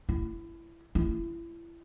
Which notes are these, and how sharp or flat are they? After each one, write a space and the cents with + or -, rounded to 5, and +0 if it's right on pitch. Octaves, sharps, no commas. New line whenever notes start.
E4 +20
E4 +30